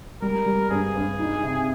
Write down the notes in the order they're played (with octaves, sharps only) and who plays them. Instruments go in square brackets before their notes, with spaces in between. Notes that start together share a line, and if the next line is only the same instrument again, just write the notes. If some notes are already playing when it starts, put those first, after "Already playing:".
[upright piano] G3 [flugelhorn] A#4
[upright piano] G3
[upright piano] G2 [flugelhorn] G#4
[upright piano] G2
D#4
C3